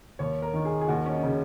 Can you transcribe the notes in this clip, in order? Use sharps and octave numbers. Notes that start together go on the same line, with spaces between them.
D#2 C#5
A#4
D#3
G#4
G#4
D#2 F#4
C#4
D#4
C#3